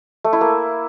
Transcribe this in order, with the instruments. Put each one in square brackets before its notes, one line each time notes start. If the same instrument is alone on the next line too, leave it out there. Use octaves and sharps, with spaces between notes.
[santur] A3
E4
A#3